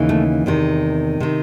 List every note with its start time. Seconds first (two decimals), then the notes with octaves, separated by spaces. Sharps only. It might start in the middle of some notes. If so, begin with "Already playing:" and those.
Already playing: D#2 C#3 E3
0.09 A3
0.46 E2 C3 D#3
1.20 C3 D#3